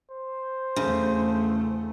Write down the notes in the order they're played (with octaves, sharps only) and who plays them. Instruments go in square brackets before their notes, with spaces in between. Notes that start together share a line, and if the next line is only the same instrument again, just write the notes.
[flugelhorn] C5
[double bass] E2 A3 [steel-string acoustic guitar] C#3